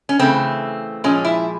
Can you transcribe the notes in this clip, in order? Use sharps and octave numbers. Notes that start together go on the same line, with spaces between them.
C#4
C#3 E3 A3 C4
A#2 F3 G#3 C#4
E4